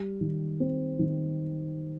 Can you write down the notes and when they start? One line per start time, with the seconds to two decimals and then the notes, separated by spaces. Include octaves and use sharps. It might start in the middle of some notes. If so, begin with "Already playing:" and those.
Already playing: G3
0.21 D#3
0.60 C4
0.99 D#3